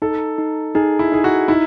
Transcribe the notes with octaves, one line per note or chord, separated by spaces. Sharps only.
D#4 A4
D#4
D#4 G#4
E4
D#4 G#4
F#4
D#4 E4